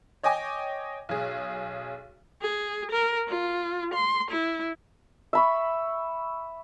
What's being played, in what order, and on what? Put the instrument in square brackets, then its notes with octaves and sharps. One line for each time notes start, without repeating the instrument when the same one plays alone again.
[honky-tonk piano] C#5 D#5 G5 G#5 D6
B1 G#4
[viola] G#4
A#4
F4
C6
E4
[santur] E5 B5 C#6